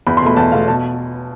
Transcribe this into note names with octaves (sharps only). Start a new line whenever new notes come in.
E2 B5
C6
B2 A3 B5
E2 A5
B2 A3 F5
B2 A5